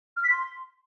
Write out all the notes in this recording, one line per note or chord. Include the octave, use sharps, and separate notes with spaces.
F6
B6
C6